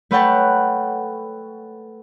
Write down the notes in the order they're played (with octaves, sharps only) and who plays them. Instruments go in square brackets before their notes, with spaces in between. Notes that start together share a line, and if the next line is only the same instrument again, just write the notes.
[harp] A3 B4 C#5 F#5 G5 A5